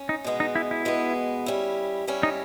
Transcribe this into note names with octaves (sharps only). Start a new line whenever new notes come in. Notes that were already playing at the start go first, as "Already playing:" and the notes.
Already playing: C#4
D#4
B2 G#3 B3
D#4
E4
E4
B2 G#3 B3
G3 C#4 E4
G3 C#4 E4
D#4